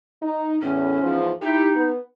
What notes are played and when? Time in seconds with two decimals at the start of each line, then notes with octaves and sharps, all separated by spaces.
0.22 D#4
0.62 E2 A2 C#4
1.02 E2 G#2 F3
1.42 D#4 E4 G4
1.76 B3